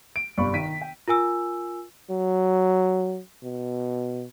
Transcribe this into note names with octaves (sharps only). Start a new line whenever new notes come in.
D7
G1 C3 D5 B5 C#6
D#3 B6 D7 D#7
G5
F4 A#4 G#5 E6
F#3
B2